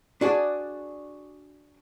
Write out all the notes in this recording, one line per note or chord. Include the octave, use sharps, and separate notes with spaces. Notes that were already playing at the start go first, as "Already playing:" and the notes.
D4 F#4 G#4 D5